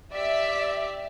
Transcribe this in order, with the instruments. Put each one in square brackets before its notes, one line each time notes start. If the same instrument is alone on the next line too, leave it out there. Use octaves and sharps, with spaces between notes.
[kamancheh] G4 D5 [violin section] E5